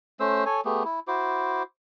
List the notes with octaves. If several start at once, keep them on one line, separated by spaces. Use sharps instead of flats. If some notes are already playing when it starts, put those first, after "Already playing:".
A3 C#4 C5 E6
A4 C#5 G#5
A3 B3 G4 G#4
E4
E4 F#4 C5 D6